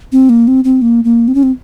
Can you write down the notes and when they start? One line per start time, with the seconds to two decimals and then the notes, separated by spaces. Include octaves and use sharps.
0.12 C4
0.29 A#3
0.48 C4
0.64 C4
0.82 A#3
1.04 A#3
1.28 C4
1.35 C#4
1.43 C4